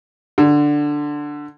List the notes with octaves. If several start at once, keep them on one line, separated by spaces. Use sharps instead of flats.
D3